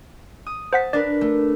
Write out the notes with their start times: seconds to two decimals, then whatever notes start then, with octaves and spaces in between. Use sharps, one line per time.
0.46 D#6
0.73 C5 F#5 A5 B6
0.93 D4 A#4 B4 D5
1.21 A3